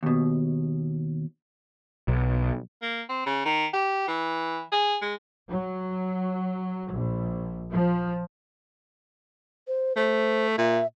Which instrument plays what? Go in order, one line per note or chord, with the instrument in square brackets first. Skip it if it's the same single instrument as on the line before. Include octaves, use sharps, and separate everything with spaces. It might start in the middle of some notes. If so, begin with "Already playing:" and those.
[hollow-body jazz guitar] D#2 B2
[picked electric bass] B1
[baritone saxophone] A#3
C4
C#3
D#3
G4
E3
G#4
G#3
[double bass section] F#3
A#1
F3
[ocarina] C5
[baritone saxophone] A3 [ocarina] C5
[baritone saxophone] A#2 [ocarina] E5